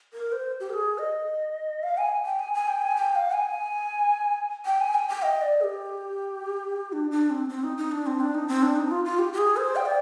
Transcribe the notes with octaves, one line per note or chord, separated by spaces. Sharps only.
A#4
C5
G4
A#4
G#4
D#5
F5
G#5
G5
G#5
G#5
G5
G#5
G5
F5
G#5
G5
G#5
G5
G5
D#5
D5
G#4
G4
D4
D4
C4
C4
D#4
D#4
D4
C4
D4
D#4
C4
D4
D#4
F4
F4
G4
G4
G#4
C5
G5
D5